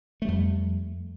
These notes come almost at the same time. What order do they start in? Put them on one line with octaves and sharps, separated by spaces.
A3 G3 F2